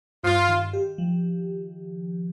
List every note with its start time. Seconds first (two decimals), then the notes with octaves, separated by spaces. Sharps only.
0.24 G2 F4
0.48 D#3
0.73 G4
0.98 F3